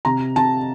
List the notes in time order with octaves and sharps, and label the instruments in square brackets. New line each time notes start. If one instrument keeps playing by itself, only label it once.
[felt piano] C3 A#5
C3 A5